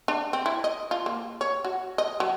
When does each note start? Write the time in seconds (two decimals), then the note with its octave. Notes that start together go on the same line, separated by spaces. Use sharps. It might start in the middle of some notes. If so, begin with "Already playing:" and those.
0.08 D4
0.33 C4
0.46 E4
0.64 D#5
0.91 F4
1.06 A#3
1.41 C#5
1.65 F#4
1.98 D#5
2.20 F#3